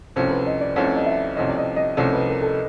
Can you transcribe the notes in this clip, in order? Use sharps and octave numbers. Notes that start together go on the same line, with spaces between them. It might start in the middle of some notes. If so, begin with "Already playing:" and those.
C2 C3 F3 A3 C#4 C5
B4
D#5
D5
C2 C3 F3 A3 C#4 C#5
D#5
E5
C2 C3 F3 A3 C#4 D#5
D5
D#5
D#5
C2 C3 F3 A3 C#4 D5
B4
A#4
A4